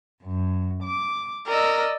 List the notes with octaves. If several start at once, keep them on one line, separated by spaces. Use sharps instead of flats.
F#2
D6
A#4 D5 D#5 E6